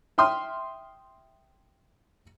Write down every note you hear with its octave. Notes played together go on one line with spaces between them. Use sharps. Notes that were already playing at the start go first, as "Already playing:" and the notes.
E5 G5 C6 D#6 F6